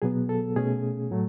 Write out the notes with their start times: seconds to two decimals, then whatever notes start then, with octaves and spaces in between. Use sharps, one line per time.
0.02 B2 F#3 B3 G#4
0.29 A4
0.56 B2 A3 C#4 G#4
1.11 A2 F#3 A3